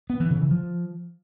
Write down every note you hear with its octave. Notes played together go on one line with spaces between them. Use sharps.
B3
E3
C#3
E3
F3